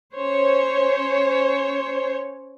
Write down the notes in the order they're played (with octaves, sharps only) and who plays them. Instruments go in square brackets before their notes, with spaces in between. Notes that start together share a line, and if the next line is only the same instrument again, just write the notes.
[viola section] C#4 C5 C#5